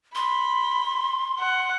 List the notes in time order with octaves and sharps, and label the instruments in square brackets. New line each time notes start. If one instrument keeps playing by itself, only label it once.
[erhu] B5 [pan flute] C6
[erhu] F#5